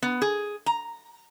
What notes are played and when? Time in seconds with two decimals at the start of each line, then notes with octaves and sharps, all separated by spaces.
0.02 B3
0.22 G#4
0.66 A#5